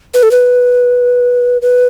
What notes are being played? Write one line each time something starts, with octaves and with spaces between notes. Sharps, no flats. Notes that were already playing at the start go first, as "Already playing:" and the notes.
B4
A4
B4
B4